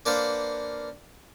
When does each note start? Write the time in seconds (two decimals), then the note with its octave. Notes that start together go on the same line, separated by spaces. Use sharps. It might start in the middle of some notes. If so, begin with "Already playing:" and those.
0.06 A#3 D4 B4 C5 F5 F#5